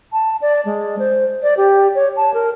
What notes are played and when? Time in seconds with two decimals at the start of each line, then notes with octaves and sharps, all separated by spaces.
0.13 A5
0.42 D5
0.65 G#3
0.99 C5
1.43 D5
1.57 G4
1.95 C#5
2.17 A5
2.34 A#4